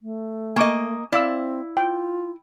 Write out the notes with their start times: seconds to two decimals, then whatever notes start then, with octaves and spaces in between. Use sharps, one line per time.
0.02 A3
0.56 A#3 D#5 G#5 C#6 D6
1.12 C4 E4 D5 F5 E6
1.77 F4 G5